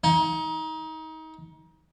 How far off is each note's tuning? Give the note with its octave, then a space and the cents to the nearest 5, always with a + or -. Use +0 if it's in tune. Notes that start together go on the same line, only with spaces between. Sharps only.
D#4 +30